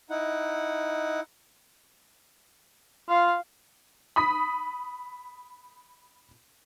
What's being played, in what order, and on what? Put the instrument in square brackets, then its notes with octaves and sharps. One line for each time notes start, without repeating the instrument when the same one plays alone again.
[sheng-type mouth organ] D#4 E4 F#5
[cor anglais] F4 [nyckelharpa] F5
[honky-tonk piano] B5 D#6 B6